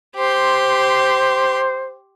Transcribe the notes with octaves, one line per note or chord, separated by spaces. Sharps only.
G4 C5 C6